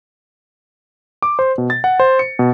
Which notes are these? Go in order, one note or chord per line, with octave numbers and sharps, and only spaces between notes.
D6
C5
B2
A6
F#5
C5
C#7
B2